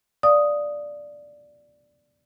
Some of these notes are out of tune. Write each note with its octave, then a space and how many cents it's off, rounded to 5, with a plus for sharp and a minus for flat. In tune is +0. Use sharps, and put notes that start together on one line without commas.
D5 +0 F5 +0 D#6 +0